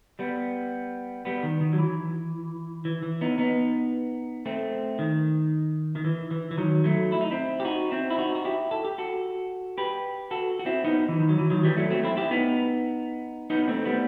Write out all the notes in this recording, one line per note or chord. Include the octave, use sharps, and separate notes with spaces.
G3 B3
G3 B3
D#3
D#3
F#3
E3
E3
E3
B3 D#4
B3 D#4
A3 C4
D#3
D#3
E3
E3
E3
D#3 F#3
F#3 A3
E4
D#4
C4 E4
G4
D#4 F#4
C4 E4
E4
D#4 F#4
F#4
E4 G4
A4
G4
F#4 A4
G4 B4
F#4 A4
F#4
C4 E4
B3 D#4
E3
D#3
F#3
E3
D#3 F#3
E3 G3
F#3 A3
A3 C4
C4 E4
E4 G4
B3 D#4
B3 D#4
A3 C4
G3 B3